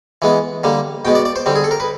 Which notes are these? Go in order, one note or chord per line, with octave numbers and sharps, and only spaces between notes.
E3 G#3 B3
D3 G3 A#3
B2 G#3 B3 G5
D5
D5
C5
D3 G3 C4
G#4
A4
A#4
B4